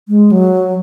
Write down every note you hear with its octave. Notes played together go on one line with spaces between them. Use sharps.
G#3
F#3